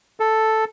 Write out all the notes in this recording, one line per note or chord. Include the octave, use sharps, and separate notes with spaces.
A4